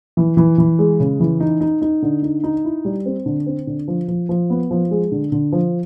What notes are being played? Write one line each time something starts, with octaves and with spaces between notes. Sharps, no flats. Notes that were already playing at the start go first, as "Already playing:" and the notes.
E3
E3
E3
G#3
C#3
E3
D#4
D#4
D#4
D3
D#4
D#4
E4
G3
C4
D3
C4
D3
F3
F3
F3
B3
F3
G#3
D3
D3
F3